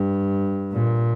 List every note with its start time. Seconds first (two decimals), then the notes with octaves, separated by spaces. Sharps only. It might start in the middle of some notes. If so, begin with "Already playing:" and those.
Already playing: G2
0.73 A#2